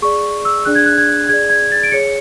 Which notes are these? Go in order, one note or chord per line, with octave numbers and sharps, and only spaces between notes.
G#4 D5 C#6
E6
D4 G#4 D5 F#6
G#6
F#6
G#6
G#4 D5 G#6
G#6
A6
D7
G#4 C#5 C#7